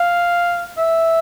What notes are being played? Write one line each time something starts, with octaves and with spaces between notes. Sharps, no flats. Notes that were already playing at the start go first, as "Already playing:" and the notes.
Already playing: F5
E5